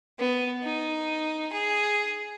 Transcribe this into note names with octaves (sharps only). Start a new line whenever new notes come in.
B3
D#4
G#4